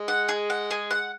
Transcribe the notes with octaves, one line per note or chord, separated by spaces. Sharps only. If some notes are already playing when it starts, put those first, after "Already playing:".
Already playing: G#3
F#5
G#4
F#5
G#4
F#5